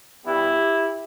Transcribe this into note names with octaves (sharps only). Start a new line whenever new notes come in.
G2 E3 G3 B3 E4 G4